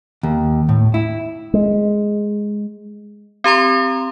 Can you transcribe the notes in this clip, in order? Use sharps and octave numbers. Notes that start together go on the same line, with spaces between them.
D#2
A2
E4
G#3
C4 G4 A#5 C6